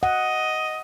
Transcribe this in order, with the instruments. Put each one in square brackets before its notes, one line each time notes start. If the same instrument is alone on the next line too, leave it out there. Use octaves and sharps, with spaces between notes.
[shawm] D#5 [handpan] F#5